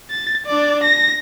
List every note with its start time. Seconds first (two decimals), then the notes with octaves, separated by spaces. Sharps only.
0.11 A6
0.46 D4 D5
0.83 A#6